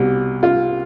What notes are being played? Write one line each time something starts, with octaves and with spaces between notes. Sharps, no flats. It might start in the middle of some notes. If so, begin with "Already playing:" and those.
Already playing: C2 B2 G3 G4
F4